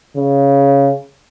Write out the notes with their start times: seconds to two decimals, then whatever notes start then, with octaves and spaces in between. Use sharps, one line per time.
0.17 C#3